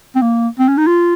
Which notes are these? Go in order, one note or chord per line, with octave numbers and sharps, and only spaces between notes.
C4
A#3
C4
C#4
D#4
F4